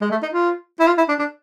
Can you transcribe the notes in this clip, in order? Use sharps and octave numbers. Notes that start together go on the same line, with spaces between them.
G#3
A3
D#4
F4
E4
F4
E4
D4
D4